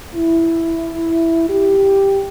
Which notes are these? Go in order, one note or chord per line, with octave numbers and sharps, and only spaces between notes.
E4
G4